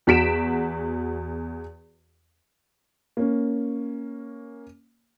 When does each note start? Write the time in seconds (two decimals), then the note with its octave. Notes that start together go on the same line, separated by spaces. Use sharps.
0.07 E2 F#4 B6 D7 E7
3.17 A#3 C#4